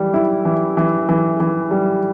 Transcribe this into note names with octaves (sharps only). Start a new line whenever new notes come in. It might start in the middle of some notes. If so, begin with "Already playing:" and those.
Already playing: E3 G3
E4
E3
E3
E3
E3
G3